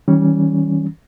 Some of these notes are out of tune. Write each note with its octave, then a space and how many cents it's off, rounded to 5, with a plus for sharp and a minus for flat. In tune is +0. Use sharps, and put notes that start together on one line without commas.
D#3 +45 G3 -20 C#4 +0